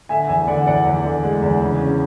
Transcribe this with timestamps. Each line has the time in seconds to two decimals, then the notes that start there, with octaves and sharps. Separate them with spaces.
0.09 D3 E5 G#5
0.29 E2 E5 G#5
0.47 D3 D5 F#5
0.66 E2 D5 F#5
0.85 E2
1.05 D3
1.23 G#3
1.42 E2
1.62 C#3
1.81 C#4